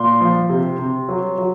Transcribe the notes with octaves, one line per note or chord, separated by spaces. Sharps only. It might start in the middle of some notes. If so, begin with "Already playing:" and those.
Already playing: A#2 C6
F3
C3
C3
F#3
F#3